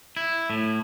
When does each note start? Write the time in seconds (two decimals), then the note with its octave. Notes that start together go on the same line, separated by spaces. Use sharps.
0.17 E4
0.50 A2